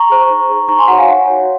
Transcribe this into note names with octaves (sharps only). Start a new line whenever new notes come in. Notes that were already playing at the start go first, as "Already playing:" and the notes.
Already playing: A#5 C#6
G#4 C5
D#4
G#4 C5
D#4 A#5 C#6
G#5 C6
F#4 C#5 F#5 A#5
F5 G#5
D#4 F#5
F#4 C#5